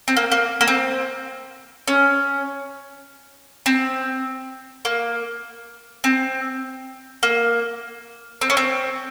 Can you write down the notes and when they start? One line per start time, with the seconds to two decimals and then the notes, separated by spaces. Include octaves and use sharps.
0.08 C4
0.17 A#3
0.32 A#3
0.61 A#3
0.68 C4
1.88 C#4
3.66 C4
4.85 A#3
6.04 C4
7.23 A#3
8.41 C4
8.50 C#4
8.57 C4